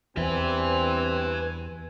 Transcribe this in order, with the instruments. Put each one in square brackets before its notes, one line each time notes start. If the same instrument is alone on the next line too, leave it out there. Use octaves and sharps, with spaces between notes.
[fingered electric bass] E2 [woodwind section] G2 G#5 [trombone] C4 [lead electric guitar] B4 E5